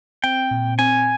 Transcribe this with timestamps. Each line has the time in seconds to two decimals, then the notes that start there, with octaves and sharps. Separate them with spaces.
0.23 C4 G5
0.51 A#2
0.79 C4 G#5